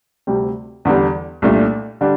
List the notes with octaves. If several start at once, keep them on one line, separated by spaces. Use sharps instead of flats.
D2 C3 G3 C4
E2 D3 G3
C2 A#2 A3 D4
D3 G3 D4